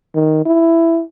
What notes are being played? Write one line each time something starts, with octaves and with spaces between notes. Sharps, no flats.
D#3
E4